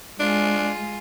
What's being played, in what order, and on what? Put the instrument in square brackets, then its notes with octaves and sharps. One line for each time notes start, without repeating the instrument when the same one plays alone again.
[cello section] G#3 [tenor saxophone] D4 [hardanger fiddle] F4 G#5